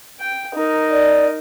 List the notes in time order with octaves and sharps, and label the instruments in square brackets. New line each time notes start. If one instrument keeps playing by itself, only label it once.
[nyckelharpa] G5
D#4 A#4
[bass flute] D5